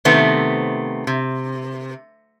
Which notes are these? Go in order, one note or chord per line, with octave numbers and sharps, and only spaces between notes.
C3 D#3 A3 B3 C4
C3